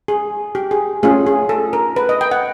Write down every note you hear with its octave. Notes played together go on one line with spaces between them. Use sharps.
G#4
G4
G#4
A3 C#4 F4 G#4
G#4
A4
A#4
B4
D#5
G5
F#5